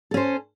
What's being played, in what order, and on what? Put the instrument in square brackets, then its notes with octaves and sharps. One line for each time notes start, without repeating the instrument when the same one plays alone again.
[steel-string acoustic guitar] A4
C#4
C5